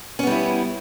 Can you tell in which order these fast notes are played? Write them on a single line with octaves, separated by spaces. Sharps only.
C#4 B3 G3 E4